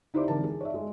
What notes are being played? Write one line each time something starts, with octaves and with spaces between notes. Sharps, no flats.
D#4 E4 G4 C5 D5 D6
G#1 D3 E3 A#4 A5
G#4
C#5 D5 E5
G#3